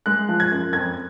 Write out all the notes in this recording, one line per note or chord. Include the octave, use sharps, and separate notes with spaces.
G#3 F#6
F3
G#6
F#2
F2 G#6